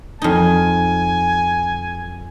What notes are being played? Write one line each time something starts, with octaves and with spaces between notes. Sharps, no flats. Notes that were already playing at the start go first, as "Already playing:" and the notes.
F2 D#4 G#5